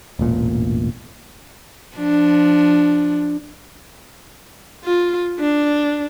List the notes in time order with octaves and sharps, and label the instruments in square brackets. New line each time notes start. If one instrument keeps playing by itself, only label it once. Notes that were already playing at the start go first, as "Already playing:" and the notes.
[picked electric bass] E1 A1 A#2
[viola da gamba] F3 D4
[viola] F4
D4